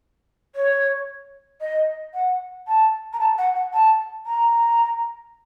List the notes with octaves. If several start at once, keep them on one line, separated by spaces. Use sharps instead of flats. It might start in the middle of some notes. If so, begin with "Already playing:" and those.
C#5
D#5
F#5
A5
A#5
A5
F#5
F#5
A5
A#5